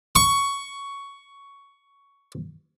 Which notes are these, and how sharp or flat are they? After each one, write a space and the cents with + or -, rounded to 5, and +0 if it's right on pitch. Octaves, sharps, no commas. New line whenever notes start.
C#6 +10